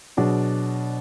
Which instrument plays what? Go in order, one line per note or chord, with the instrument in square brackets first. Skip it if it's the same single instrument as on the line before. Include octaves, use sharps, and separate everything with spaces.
[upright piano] B2 F#3 D4 G#4